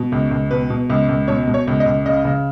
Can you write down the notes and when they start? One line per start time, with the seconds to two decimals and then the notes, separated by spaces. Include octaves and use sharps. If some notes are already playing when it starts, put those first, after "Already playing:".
Already playing: B2
0.12 C#2
0.31 C#2
0.51 B2 B4
0.70 B2
0.90 C#2
1.09 C#2
1.28 B2 C#5
1.47 B2
1.54 C#5
1.67 C#2
1.80 D#5
1.86 C#2
2.06 C#3 D#5
2.25 C#3